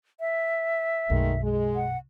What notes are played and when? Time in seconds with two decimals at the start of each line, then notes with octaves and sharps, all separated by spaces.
0.20 E5
1.10 B1 F#2 D#3 G#3 A3
1.43 G#3
1.75 F#5